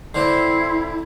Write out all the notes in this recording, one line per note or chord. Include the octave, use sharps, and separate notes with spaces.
D3 C4 E4 C6